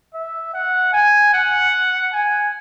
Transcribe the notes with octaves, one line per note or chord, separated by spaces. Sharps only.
E5
F#5
G#5
F#5
G#5